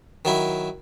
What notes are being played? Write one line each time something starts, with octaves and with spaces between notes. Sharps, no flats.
D#3 F#3 E4